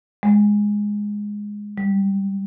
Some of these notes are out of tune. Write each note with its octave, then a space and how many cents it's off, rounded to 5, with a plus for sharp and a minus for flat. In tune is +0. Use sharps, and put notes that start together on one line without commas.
G#3 -5
G3 +0